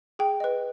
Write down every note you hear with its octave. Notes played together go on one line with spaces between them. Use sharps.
G#4 G5
B4 D#5